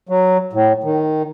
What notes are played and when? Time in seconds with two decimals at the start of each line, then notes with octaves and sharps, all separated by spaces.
0.09 F#3
0.53 A2
0.84 D#3